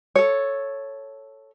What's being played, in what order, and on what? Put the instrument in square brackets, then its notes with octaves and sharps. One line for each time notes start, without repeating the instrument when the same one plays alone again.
[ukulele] A4 C#5